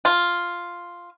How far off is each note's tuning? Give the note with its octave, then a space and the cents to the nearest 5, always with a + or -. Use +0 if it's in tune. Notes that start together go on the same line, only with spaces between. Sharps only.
F4 +0